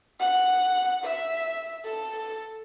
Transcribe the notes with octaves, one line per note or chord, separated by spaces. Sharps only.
F#5
E5
A4